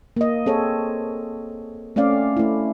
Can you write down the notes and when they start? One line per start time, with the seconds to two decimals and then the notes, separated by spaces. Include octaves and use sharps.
0.16 A#3 D#5
0.46 C4 G#4 A4 C#5
1.96 A3 C4 C#4 D5 F5
2.37 A3 E4